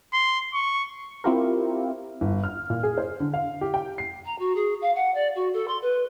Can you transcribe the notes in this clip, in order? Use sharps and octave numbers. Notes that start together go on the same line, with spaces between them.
C6
C#6
C4 E4 F4 G4 A#4
G1
F6
A#2
G#4
C5
D3
F5
G4
G5
C7
A#5
F#4
G#4
F5
F#5
D5
F#4
A4
C6
B4